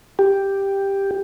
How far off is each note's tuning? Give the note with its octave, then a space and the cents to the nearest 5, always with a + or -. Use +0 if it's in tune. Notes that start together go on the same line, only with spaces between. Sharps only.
G4 +5